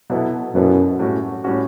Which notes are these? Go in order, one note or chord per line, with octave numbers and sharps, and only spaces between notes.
B2 F#3 B3 E4 A4
F#2 B2 F#3 B3 E4 A4
A2 G3 C#4 F#4
A2 G3 C#4 F#4